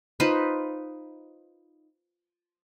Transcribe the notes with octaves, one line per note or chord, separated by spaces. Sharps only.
D#4 F4 B4 C5